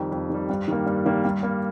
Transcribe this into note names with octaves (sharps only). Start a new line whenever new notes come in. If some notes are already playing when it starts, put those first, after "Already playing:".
Already playing: F2 D#3 G3
F2
D#3 G3
G2
D#3 G3 A#3
G2
D#3 G3 A#3
G2
G3 A#3